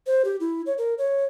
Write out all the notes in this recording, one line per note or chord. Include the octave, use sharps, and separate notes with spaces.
C5
G4
E4
C#5
A#4
C#5